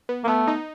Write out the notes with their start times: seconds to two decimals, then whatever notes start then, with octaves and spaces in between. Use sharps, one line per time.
0.09 B3
0.24 A#3
0.28 A3 B3
0.47 D#4